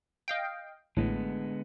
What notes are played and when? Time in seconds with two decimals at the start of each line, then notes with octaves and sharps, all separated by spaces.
0.28 D#5 F5 G5
0.97 A1 A2 D3 G#3 B3